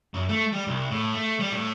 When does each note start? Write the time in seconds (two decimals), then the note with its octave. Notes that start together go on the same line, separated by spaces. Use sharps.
0.14 F#2
0.29 A3
0.53 G3
0.68 C2
0.91 A2
1.12 A3
1.39 G3
1.52 A2